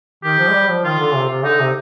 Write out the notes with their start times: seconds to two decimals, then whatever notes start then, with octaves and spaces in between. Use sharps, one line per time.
0.23 D#3 G4
0.38 F3
0.48 G#3
0.53 G3
0.69 F3
0.84 D#3 F4
0.99 D3
1.14 C3
1.29 C3
1.44 D3 D#4
1.60 C3